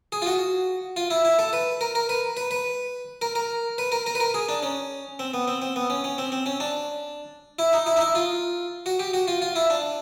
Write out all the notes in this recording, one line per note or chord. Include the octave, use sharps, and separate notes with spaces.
G#4
F4
F#4
F4
E4
E4
A4
B4
A#4
A#4
B4
B4
B4
A#4
A#4
B4
A#4
A#4
B4
A#4
G#4
D4
C#4
C4
B3
C4
C4
B3
C#4
C#4
C4
C4
C#4
D4
E4
D#4
E4
D#4
E4
F4
F#4
G4
F#4
F4
F4
E4
D4